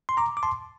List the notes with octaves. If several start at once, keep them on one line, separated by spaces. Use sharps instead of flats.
C6
A#5 D6
D6
A5 C6